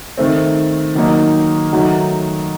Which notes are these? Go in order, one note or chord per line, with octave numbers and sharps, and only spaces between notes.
D#3 A3 C4
D#3 F#3 A#3 D#4
D#3 F#3 A3 D#4 F#4